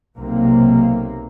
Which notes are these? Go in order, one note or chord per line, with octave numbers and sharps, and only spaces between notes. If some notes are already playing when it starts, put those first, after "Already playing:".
B1 C3 A#3